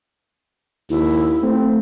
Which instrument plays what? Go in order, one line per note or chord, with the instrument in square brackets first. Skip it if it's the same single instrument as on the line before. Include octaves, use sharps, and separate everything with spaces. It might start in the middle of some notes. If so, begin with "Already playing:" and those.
[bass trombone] D#2 [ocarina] E4
[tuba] A3 [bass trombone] C4